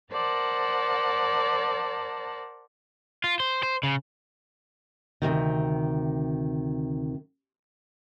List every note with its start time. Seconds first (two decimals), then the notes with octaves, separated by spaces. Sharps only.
0.12 A#4 C5 D5 F#5 A5
3.24 F4
3.40 C5
3.63 C5
3.83 C#3
5.22 D2 G2 C3 D#3